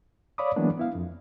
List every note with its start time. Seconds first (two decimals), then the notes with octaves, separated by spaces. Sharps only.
0.38 C#5 D5 F5 B5 D6 D#6
0.56 E3 F#3 G#3 A#3 B3 D4
0.77 B3 E4 F5
0.95 F2